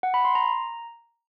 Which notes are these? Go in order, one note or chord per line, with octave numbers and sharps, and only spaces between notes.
F#5
B5
C6
A#5